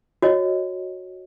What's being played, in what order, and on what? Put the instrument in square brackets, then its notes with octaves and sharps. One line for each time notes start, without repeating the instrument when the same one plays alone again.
[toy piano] F#4 C#5 D#5